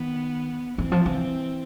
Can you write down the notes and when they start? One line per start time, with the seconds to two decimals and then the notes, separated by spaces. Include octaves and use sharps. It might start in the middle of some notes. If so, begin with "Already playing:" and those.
Already playing: D#3 B3
0.78 E3 C4
0.92 F3
1.06 E3